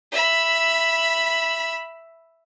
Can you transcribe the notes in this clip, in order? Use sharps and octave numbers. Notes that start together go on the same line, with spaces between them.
E5 B5